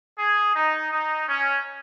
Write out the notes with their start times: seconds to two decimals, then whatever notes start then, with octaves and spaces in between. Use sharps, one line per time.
0.18 G#4
0.56 D#4
0.91 D#4
1.28 C#4